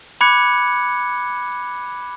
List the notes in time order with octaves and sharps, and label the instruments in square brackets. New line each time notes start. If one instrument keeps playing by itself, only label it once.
[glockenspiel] B5 D6 F#6 G#6 C#7